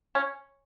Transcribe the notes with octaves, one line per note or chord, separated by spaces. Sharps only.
C#4